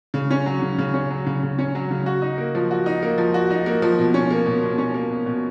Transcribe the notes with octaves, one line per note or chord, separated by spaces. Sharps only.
C#3
C#4
F#3
C#3
C#3
C#4
F#3
C#3
C#3
C#4
F#3
C#3
F#4
D#4
A#3
F3
F#4
D#4
A#3
F3
F#4
D#4
A#3
F3
B2
C#4
A#3
B2
B2
C#4
A#3
B2
B2